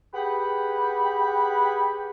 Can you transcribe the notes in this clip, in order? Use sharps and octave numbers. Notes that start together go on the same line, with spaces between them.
G4 G#4 B4 F#5 G5 B5